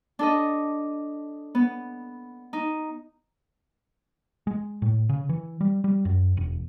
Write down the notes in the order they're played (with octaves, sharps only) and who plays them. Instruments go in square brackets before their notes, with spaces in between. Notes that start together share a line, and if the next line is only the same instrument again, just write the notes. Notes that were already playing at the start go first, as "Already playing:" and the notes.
[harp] D4 A4 D#5
B3
D#4
[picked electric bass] G#3
A2
C#3
E3
G3
G3
F#2
E1